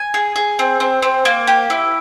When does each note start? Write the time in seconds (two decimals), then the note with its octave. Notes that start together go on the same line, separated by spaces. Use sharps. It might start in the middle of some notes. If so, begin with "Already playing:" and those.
Already playing: G#5
0.14 G#4
0.36 G#4
0.59 C4
0.80 C4
1.02 C4
1.25 A#3
1.47 G4
1.70 E4